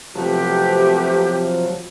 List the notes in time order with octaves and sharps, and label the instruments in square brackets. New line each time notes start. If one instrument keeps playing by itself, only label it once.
[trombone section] C3 [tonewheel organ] F3 F#3 [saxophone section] A3 B3 F#4 [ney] G4